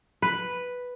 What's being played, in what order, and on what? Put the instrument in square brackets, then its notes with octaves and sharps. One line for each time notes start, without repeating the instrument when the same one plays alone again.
[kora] B4